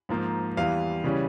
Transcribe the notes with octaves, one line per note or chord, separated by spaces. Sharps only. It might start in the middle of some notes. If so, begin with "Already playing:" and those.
G#2 F3 A#3
E2 E3 G3 F5
C#3 E3 G3 C#4